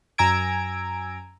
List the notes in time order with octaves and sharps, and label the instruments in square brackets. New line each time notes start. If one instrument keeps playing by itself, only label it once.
[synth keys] F#2 G#5 A#5 E6 G#6 D7